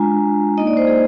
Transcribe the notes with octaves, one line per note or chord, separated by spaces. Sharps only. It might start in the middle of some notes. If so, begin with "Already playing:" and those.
Already playing: G#3 D4 F4 G#5 A#5
A#3 D#4 D#5
D5
C5
G#4